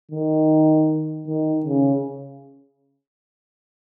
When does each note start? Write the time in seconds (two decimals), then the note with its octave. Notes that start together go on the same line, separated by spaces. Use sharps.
0.11 D#3
1.28 D#3
1.65 C#3